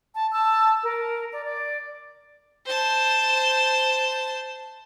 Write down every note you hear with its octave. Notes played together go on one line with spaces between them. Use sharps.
A5
A5 E6
A#4
D5
D5
C5 A5